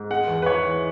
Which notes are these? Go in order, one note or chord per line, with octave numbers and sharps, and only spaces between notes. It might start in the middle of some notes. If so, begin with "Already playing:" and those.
Already playing: G#2
G#3 F#5
E2
B4
E3 C#5
E3